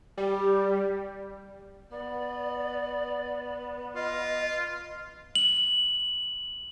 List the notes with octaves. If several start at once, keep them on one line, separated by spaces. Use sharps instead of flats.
G3
B3 D5
F4 D#5
F#7